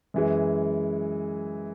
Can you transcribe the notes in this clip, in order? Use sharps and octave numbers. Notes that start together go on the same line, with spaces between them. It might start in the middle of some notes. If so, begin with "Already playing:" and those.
F#2 E3 G#3